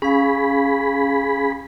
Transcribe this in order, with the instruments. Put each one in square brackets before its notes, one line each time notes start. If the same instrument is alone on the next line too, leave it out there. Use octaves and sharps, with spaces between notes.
[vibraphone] C#4 F5 [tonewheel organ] G#4 B5